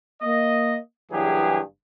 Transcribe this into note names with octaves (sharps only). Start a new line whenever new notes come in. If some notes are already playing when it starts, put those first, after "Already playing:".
A#3 D#5
F#1 G2 E3 F#3 G4 G#4